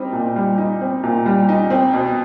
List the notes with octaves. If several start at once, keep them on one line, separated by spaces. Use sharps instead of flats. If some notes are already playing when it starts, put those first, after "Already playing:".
Already playing: G3 C4 D#4
A#2
G3
D#4
C4
A#2
G3
D#4
C4
B2